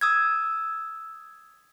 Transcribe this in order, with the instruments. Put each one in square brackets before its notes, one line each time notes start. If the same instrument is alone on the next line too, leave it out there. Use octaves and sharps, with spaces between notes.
[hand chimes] D#6 E6 G#6